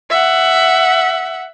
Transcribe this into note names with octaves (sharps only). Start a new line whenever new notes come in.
E5 F#5